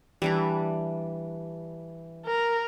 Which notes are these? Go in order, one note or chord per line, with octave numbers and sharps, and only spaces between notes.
E3 G3 D4 A#5
A#4